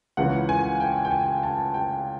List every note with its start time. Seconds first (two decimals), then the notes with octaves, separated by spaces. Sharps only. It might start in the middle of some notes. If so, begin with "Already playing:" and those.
0.17 C#2 C#3 E3 F#5
0.49 G#5
0.80 G5
1.05 G5
1.11 G#5
1.43 A5
1.74 G5